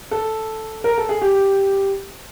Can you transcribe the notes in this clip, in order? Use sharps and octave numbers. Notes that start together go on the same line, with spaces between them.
A4
A#4
A4
G#4
G4